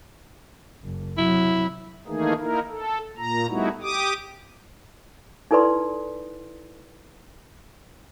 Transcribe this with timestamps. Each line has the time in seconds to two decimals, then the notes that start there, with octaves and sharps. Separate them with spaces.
0.84 F#1
1.17 C3 F#3 E4
2.07 D#3 E3 A3 A#3 D#4 G#4
2.40 A#3 D#4 E4 A#4
2.70 A4
3.17 A#2 A#5
3.49 G3 A3 B3 D#4 E4 F#4
3.82 G4 D6 D#6
5.51 D#4 E4 A4 B4 D5 C6